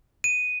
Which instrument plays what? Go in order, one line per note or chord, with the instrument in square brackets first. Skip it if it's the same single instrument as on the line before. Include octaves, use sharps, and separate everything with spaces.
[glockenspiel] D#7